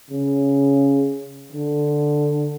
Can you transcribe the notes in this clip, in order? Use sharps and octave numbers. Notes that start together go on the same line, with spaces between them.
C#3
D3